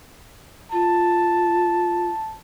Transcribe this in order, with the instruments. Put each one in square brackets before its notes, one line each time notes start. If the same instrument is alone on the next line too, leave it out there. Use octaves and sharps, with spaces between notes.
[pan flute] F4 [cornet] A5